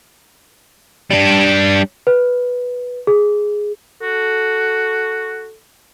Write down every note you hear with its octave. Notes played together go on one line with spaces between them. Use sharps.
G3 D4
B4
G#4
F#4 A4